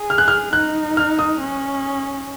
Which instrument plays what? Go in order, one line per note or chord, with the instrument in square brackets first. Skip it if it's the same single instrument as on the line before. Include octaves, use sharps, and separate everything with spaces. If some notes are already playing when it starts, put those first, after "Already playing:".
Already playing: [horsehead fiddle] G#4
[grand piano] F6
F#6
F6
[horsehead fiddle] D#4 [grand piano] F#6
[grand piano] F6
D#6
[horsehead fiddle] C#4